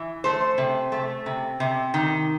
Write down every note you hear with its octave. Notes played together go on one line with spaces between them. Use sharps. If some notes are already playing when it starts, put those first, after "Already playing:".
Already playing: E3
A3 C5
C3
A3
C3
C3
D#3